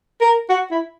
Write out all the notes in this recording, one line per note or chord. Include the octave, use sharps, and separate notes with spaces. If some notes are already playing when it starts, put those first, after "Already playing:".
A#4
F#4
E4